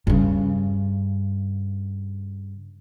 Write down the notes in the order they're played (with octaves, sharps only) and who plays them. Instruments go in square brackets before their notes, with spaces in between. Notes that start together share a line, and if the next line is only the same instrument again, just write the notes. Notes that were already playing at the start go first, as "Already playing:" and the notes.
[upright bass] G2 C#3